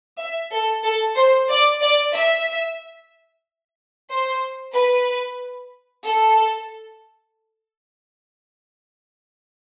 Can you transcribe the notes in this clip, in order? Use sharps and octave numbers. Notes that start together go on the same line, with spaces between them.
E5
A4
A4
C5
D5
D5
E5
C5
B4
A4